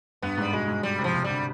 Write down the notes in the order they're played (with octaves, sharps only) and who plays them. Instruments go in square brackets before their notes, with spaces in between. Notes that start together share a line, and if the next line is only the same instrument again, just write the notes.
[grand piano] G2 [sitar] B3
[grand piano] G#2 [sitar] G3
[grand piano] B2 [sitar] G#3
[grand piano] G#2
[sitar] G3
[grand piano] C3
[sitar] F3
[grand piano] C3
[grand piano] D3 [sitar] G3